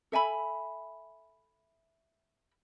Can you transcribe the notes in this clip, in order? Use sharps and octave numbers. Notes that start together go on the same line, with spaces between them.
A4 E5 G#5 B5